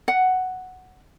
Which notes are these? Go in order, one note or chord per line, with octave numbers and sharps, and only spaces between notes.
F#5